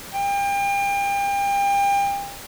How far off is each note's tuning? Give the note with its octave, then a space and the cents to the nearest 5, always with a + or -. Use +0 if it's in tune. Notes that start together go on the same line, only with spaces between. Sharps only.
G5 +35